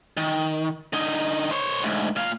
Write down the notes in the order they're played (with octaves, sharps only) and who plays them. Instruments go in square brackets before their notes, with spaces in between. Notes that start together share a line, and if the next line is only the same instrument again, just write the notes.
[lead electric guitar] D#3
D3 D#4
C5 C#5
D2 G#2
A#2 F5